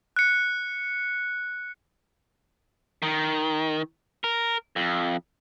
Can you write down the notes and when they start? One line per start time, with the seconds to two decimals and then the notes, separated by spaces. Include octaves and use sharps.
0.16 F#6 C#7
3.03 D#3
4.24 A#4
4.76 F2